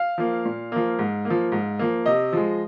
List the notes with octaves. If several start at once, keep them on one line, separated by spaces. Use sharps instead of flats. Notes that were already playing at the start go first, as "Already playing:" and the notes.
Already playing: F5
F3 A#3
A#2
F3 A#3
G#2
A#3
F3
G#2
F3 A#3
C3 D#5
F3 G#3